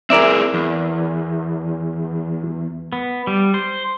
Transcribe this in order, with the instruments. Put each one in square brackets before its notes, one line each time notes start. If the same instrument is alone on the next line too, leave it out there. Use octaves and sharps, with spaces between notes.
[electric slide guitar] C4 E4 G#4 [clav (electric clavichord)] A#4 D5 E5
[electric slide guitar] E2
[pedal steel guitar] B3
G3
C5